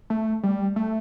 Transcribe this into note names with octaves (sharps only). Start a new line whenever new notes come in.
A3
G3
A3